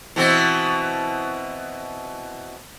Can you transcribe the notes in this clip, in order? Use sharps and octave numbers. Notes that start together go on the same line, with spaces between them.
B2 E3 C4